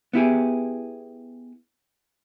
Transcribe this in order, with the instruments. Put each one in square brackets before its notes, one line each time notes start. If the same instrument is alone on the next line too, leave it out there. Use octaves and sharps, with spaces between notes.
[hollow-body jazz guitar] B3 E4 G4 G#4